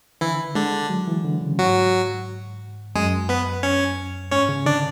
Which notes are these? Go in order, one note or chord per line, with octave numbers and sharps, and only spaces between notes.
D3 E3 E4
D3 G#3 D4
F#3
E3
D3
C#3
G#2 F#3 F#4
F#2 G#3 G#4
B3 B4
C#4 C#5
G#2 C#4 C#5
C#3
D3 D4 D5